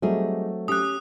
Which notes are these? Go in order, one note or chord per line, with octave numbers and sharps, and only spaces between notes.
F#3 G3 A3 C4 D#4 G#4
C#4 G4 D#6 F#6